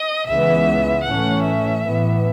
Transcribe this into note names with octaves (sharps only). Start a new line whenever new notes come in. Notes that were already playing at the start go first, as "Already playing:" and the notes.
Already playing: D#5
C#2 C#3 E3 G#3 B3 E5
A2 E3 A3 C#4 F#5
E5
A2 E3 B3